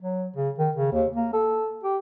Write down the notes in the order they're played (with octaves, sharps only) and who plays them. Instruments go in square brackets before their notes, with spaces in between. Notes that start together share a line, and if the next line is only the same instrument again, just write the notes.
[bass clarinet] F#3
C#3
D#3
C#3
D#2
A#3
A4
G4